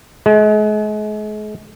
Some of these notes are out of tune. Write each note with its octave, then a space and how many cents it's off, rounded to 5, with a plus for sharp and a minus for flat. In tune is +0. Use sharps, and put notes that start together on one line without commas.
G#3 +40